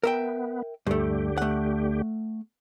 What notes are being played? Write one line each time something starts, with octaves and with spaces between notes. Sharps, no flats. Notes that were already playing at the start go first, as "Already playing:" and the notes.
B3 A#4 E5 G5
D2 G2 D3 A3 G4
A3 F#5